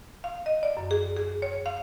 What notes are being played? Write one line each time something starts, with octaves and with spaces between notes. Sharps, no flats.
F5
D#5
D5
F#2
G#4
G#4
C#5
F5